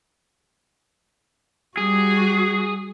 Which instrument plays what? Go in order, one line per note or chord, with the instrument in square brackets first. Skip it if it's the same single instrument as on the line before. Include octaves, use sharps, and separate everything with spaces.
[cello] G3 F#4 [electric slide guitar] G#4